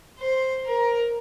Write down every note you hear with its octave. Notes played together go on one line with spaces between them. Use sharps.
C5
A#4